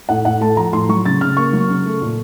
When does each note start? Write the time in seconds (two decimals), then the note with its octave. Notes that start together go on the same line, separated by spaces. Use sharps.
0.09 A2 F#5
0.25 A2 F#5
0.41 A3 A5
0.56 F3 A#5
0.73 A2 C6
0.89 F#3 C#6
1.06 C#3 A6
1.21 C#3 F6
1.37 A#3 C#6
1.53 F#3
1.69 C#3
1.86 A3
2.01 A#2